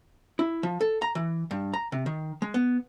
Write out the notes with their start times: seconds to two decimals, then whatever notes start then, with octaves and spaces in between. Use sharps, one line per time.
0.39 E4
0.63 F3
0.81 A4
1.02 A#5
1.15 E3
1.51 G2
1.73 A#5
1.92 C3
2.06 D#3
2.42 G#3
2.54 B3